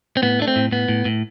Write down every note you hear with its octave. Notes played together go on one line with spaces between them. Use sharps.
C4
A2 B3
A3 D4
C4
A2
A2 B3
A2
A2